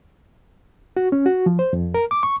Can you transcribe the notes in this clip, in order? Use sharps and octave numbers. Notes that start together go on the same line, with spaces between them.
F#4
C#4
F#4
F3
C5
F2
A#4
D6
C#6